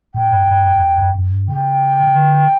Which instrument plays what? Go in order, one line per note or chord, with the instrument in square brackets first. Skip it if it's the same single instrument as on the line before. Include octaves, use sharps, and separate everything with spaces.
[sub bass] A2 [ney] G5
[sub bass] G2
G2
F#2
F#2
E2
F#2
F#2
G2
[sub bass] C#3 [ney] G5
[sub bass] C#3
D3